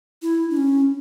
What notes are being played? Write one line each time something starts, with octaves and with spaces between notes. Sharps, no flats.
E4
D4
C#4